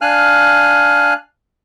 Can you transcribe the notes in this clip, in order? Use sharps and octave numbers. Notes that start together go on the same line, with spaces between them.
D4 F5 G#5 F6 F#6